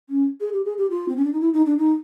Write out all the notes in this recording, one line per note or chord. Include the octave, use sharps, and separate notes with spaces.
C#4
G#4
G4
G#4
G4
F4
C4
C#4
D4
D#4
E4
D#4
D4
D#4